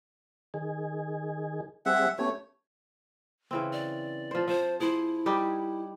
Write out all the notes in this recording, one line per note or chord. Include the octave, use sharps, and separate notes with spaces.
D#3 G#4
G3 C4 G#4 E5 F#5
A3 B3 C#4 G4 C#5
C#3 E3 C4
D5
F3 C5
F3 C5
E4 G#4 C5
G3 D#4 G4